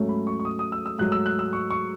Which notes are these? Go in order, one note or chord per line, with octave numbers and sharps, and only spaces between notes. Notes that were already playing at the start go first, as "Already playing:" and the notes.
Already playing: G#2 F#3 A3 C#4
B5
C#6
C#6
D#6
D#6
E6
E6
G#2 F#3 A3 F#6
E6
F#6
E6
C#6
C#6